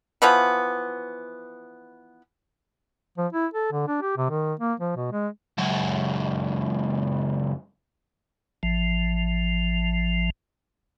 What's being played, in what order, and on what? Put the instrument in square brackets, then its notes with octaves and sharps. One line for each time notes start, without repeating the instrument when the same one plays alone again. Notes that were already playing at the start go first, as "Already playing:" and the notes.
[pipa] E3 F3 B3
[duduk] F3
E4
A4
D3
D4
G4
C3
D#3
A#3
F3
B2
G#3
[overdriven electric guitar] C#2 F#2
[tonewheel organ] A1 F3